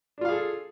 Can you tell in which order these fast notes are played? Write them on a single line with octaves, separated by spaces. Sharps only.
D4 F4 F5 G#4 A4